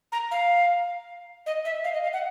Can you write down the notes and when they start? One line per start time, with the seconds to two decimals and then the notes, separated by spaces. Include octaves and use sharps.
0.12 A#5
0.31 F5
1.46 D#5
1.65 E5
1.84 F5
1.94 D#5
2.03 F5
2.13 F#5